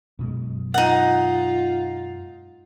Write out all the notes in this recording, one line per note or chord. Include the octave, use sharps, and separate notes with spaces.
F#2 B2 G#3
D#4 F4 F#5